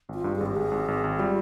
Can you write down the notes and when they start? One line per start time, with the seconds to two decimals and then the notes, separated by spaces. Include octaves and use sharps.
0.09 G#1
0.14 F4
0.24 G2
0.36 G#1 G#4
0.46 G4
0.56 G#1 G#4
0.71 G#1
0.88 G#1
1.04 G#1
1.19 G3 F4